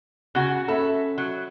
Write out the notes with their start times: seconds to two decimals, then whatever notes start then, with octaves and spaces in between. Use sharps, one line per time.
0.35 C#3 F#4 F#5 F#6
0.68 C#4 A4 E5 B5
1.18 F#3